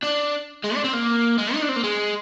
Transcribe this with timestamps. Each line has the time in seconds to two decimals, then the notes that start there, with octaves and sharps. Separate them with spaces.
0.03 D4
0.64 G#3
0.75 D4
0.84 C4
0.93 A#3
1.38 G#3
1.54 D#4
1.62 D4
1.69 C4
1.76 A#3
1.84 G#3